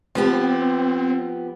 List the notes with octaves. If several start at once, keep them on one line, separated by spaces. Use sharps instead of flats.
F3 B3 C4 G4